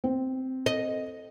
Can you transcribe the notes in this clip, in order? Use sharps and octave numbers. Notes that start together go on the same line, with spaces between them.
C4
D#5